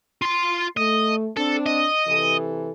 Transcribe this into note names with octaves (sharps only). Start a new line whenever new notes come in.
F4 C6
A3 D#5
C4 D4 A4
D#5
C3 E3 A4